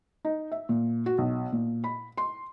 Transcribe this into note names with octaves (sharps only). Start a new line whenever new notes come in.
D#4
E5
A#2
F#4
B1
A#2
B5
C6